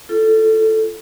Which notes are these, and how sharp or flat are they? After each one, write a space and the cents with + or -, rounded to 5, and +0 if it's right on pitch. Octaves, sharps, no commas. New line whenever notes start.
F4 -35 A4 +0